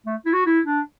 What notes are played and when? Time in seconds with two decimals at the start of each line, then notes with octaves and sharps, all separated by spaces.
0.06 A3
0.26 E4
0.33 F#4
0.46 E4
0.66 D4